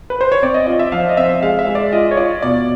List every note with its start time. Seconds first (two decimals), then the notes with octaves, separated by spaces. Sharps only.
0.10 B4
0.21 C5
0.32 C#5
0.42 C4 D5
0.54 D#5
0.67 F4 D#5
0.79 E5
0.92 F3 F5
1.09 D#5
1.17 C4 E5
1.42 G#3 F5
1.59 E5
1.67 G#3
1.75 D5
1.93 F4 D#5
2.11 C#5
2.17 F4 D5
2.42 B2 D5